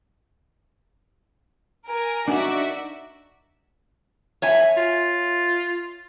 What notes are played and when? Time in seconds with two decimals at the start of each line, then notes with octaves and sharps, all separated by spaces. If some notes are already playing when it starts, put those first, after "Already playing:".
1.86 A#4 G#5
2.28 D4 D#4 F#4 A#4 D5 E5
4.42 C#5 E5 G#5
4.77 F4